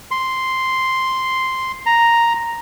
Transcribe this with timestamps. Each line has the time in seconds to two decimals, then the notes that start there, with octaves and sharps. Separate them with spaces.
0.11 C6
1.86 A#5